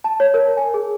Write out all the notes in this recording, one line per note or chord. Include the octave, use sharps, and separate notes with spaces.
A5
C#5
A#4
G#5
G#4